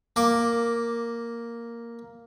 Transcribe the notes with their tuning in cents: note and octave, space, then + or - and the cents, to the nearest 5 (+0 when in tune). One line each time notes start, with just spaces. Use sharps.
A#3 +0 D6 +0